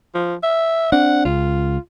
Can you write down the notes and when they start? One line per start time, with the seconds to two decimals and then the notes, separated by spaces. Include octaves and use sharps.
0.14 F3
0.43 E5
0.92 C4 D4 F#5
1.25 C#2 F4